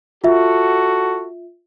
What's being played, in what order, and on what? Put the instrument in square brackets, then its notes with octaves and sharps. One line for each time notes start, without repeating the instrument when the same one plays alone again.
[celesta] F4 E5 [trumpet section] F#4 A4